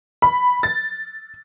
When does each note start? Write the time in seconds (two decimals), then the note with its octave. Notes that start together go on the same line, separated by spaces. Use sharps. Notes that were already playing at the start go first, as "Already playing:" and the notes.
0.22 B5
0.63 A6